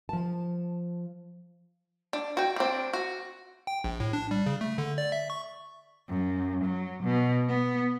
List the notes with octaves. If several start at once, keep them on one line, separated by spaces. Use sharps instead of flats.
F3 A5
D4
F#4 G5
C4 D4
F#4
G5
A#1
A2
D4
G3
C#3
A3
D3
D5
E5
C#6
F#2
F#3
B2
B3